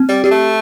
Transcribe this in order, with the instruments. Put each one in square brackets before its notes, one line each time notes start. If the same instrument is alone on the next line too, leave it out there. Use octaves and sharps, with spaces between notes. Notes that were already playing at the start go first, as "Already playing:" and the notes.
Already playing: [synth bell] C4
[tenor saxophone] G3
[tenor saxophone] G3 [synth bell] G4
[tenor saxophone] A3